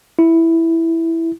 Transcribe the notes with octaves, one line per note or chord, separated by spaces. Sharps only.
E4